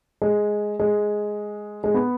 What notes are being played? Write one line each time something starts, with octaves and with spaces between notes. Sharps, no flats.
G#3
G#3
G#3
B3